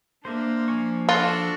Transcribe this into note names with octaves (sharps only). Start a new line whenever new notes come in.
A#3 D4 C5 E5
F3 G#5 C#6
D4 F4 F#4 A4